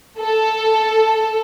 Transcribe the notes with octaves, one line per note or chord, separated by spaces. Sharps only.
A4